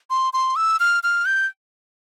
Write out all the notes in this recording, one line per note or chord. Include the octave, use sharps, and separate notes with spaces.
C6
C6
E6
F6
F6
G6